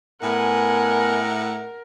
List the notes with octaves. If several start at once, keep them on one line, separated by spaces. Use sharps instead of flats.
A2 B3 A#4 F#5 G#5